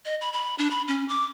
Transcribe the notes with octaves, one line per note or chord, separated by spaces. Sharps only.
D#5
B5
B5
D4
B5
C#4
D6